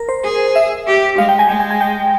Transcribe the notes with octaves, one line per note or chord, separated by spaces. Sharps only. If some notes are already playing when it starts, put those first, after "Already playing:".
Already playing: A#4
C5
G#4
E5
G4
G#3 F5
G5
G#5
G#3 G5
G#5
G#5
G5